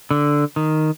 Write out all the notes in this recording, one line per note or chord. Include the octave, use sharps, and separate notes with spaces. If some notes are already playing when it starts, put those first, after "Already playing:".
D3
D#3